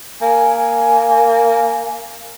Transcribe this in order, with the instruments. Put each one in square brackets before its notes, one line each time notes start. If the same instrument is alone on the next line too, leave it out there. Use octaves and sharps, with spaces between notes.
[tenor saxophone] A#3 [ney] G#5